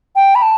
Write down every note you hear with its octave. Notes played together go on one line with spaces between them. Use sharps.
G5
B5
A5